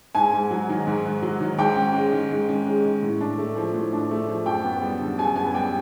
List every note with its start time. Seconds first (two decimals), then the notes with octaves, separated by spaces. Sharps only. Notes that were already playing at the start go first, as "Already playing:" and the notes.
0.15 G#2 G#5
0.33 G#2
0.51 F#3
0.69 D#3
0.87 G#2
1.05 G#2
1.22 F#3
1.40 D#3
1.58 G#2 G5
1.76 C#4
1.94 G#3
2.12 D#3
2.31 G#2
2.49 C#4
2.67 G#3
2.84 D#3
3.02 A2
3.21 D4
3.38 A3
3.56 F3
3.74 A2
3.93 D4
4.11 A3
4.28 F3
4.46 F#2 G5
4.65 B3
4.82 G3
5.00 D3
5.18 F#2 G#5
5.36 B3 G#5
5.54 G3 G5